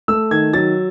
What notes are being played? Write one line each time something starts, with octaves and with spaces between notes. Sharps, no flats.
A3 E6
D#3 G#6
F#3 A6